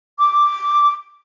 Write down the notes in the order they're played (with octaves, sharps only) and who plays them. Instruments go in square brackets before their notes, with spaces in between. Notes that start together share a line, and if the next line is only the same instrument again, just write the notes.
[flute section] D6